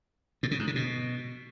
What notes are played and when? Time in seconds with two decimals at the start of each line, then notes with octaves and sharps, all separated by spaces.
0.43 A2
0.51 C#3
0.59 G#2
0.67 C#3
0.76 B2